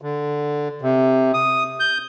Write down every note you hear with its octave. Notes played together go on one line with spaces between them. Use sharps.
D3
C3
D#6
G6